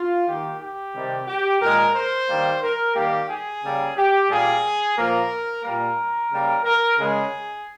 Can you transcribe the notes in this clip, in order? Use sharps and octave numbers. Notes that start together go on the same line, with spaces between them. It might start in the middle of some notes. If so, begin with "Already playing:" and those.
Already playing: F4
D#3 A#3 G4
G4
C3 D#3 G3
G4
A#2 G#3 A#4
C5
D#3 G3 A#3
A#4
D#3 G3 A#3 G4
G#4
C#3 G3 A#3
G4
A#2 G3 A#3 G#4
A#2 F3 A#3 A#4
A#2 G3 A#3 A#4
C#3 G3 A#3
A#4
C#3 G#3 G#4